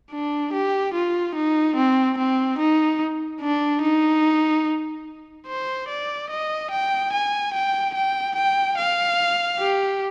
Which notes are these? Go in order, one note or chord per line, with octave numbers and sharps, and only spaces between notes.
D4
G4
F4
D#4
C4
C4
D#4
D4
D#4
C5
D5
D#5
G5
G#5
G5
G5
G5
F5
G4